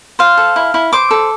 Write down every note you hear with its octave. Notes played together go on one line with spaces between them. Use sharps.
C5 F5
A4
E4
E4
C5 D6
A4